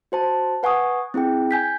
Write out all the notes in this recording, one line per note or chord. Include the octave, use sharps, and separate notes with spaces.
F#4 C5 A5
B4 F#5 G#5 C#6 D#6
C4 E4 G#4 G5
G#5 G6 B6